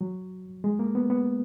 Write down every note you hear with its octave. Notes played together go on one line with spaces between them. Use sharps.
F#3
G#3
A#3
B3
B3